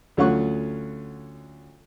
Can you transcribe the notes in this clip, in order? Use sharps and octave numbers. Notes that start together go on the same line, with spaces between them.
D2 F#3 C#4 F4 F#5 C#6